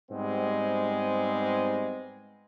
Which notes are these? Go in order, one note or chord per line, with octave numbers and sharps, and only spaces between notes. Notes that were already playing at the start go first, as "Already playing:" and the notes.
G#2 G3 G#3 B3 C4